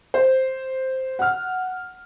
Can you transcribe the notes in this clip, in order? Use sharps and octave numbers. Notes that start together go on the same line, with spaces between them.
C5
F#5 F6